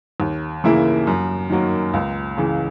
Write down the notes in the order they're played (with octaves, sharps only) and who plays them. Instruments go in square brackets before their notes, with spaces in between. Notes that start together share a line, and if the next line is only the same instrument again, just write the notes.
[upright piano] D#2
C#3 E3 A#3 E4
F#2
D#3 F#3 A#3
C#2
C#3 E3